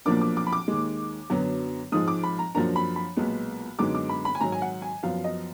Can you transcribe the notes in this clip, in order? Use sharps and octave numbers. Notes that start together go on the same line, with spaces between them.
B1 A#2 F3 A#3 D4 D6
D6
D6
B5
D6
D#2 D#3 G#3
F#2 D3 F#3 B3
G#2 F3 G#3 D#6
D6
B5
A#5
F#2 F3 A#3 D4 A#5
B5
B5
B1 A#2 G#3 B3
F#2 D3 G#3 B3 D#4 D6
D6
B5
B5
G#5
G#2 D#3 F#3 A#5
G#5
F#5
G#5
F#2 F3 B3 F5
D#5